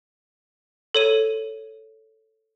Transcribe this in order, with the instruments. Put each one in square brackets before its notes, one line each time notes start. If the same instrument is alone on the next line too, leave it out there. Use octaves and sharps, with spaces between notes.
[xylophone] A4 C#5 D#7